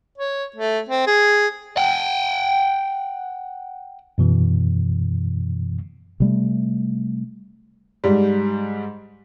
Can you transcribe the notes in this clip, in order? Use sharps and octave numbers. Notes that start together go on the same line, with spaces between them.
C#5
A3
C4
G#4
F#5 G5
F#2 B2 E3
C3 G3 A3
G#2 G3